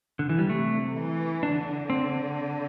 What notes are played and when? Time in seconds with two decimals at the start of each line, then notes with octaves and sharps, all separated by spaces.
0.19 D3
0.29 E3
0.38 G3
0.49 C3 A3
0.97 E3
1.43 D3 D4
1.90 C4